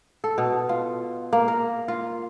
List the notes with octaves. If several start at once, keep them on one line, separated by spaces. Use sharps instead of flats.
A4
B2
F4
A#3
A#4
F4